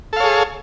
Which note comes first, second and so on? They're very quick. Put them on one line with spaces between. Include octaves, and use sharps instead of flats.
A4 F5 C#5 G#4